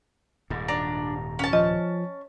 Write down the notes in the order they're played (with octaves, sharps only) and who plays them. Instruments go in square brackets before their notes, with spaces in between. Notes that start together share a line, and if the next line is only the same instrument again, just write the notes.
[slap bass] D#1 G#2
[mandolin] D4 [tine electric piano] A#5
[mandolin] C#4 A5
[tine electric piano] F3 [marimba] D#5